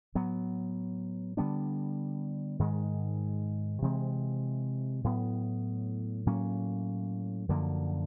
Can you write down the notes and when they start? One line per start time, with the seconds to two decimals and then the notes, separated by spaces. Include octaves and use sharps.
0.15 A2 F#3 B3
1.37 D3 G3 B3 D4
2.59 G#2 D#3 G#3
3.82 C3 E3 G#3 C4
5.04 A2 F#3 B3
6.26 A2 F#3 A#3 C#4
7.49 F#2 D3 F3 A#3